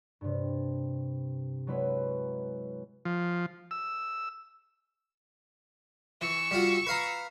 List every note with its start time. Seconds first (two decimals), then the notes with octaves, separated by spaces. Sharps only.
0.21 G2 C3
1.67 F#3 G#3 E4 B4
3.05 F3
3.71 E6
6.21 E3 C#6 E6
6.51 G3 F4 F#4
6.87 B4 F5 A#5